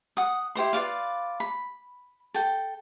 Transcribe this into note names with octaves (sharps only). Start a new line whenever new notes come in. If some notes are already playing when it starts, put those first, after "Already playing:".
F#5 D#6
E4 G4 C5 C6
F4 B4 D5 F5
B5
A4 G5